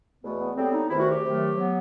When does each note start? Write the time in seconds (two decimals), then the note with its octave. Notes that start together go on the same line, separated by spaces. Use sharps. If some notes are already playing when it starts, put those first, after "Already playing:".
0.22 E2 B2 A3 B3
0.40 B3
0.56 A2 G3 B3 C4
0.73 D#4
0.89 E2 C3 D#3 A3 E4
1.00 F#4
1.11 G4
1.22 C3 D#3 F#3 A3
1.56 F#3 B3